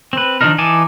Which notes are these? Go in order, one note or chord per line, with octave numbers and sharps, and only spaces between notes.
C4 B4
D#3 F3 D4 D#4 A#4
E3 D#4 G#5 A5 D6